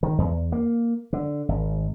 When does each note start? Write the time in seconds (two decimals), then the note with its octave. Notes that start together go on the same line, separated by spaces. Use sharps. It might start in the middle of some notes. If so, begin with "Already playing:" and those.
0.03 D#3
0.18 E2
0.52 A#3
1.13 D3
1.49 G#1